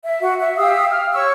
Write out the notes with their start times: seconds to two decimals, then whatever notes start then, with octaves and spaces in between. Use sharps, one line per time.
0.03 E5
0.21 F#4 F#5
0.40 E5
0.58 G4 F5 D#6 E6
0.90 F6
1.13 C#5 C#6 E6